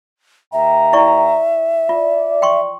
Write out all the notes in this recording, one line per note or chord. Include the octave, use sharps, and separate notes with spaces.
D#2 E5 G5 A#5
E4 D5 C#6
F4 D5
G5 C6 C#6